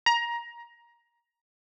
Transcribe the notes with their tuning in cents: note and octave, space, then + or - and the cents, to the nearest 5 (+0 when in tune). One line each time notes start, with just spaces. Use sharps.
A#5 +15